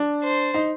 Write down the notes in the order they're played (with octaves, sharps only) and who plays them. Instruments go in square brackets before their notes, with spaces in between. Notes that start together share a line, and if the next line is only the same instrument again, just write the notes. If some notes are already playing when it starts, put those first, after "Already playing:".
Already playing: [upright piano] D4
[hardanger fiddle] C5
[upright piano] D#4